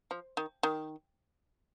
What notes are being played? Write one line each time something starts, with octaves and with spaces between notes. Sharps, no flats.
F3
D#3
D#3